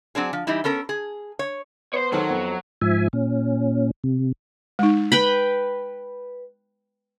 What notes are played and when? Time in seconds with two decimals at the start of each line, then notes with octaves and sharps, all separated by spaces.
0.15 F#3 C4 D4 G#4
0.33 F3
0.47 E3 G3 D#4 E4
0.64 B3 C#4 A4 A#4
0.89 G#4
1.39 C#5
1.94 B3 C5 C#5
2.12 D#3 F#3 A4 C5
2.29 F2 B3
2.82 G#2 F3 E5 G#5
3.13 A#2 C#4
4.04 C3
4.79 G#3 D#4
5.12 B4 G5 B5